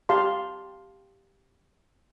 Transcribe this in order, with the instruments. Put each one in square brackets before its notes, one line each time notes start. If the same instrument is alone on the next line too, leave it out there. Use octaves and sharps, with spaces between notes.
[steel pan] G4 F5 A5 C6